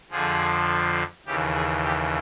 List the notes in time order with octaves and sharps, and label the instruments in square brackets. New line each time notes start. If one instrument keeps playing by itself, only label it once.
[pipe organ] F2 D3 F3 G#4
D#2 C#3 E3 G4
G#4
G4